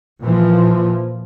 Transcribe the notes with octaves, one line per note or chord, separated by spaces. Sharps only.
A#2 E3 F3